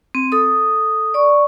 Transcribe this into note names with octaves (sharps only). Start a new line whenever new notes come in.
C4
A4 D#6
D5 C#6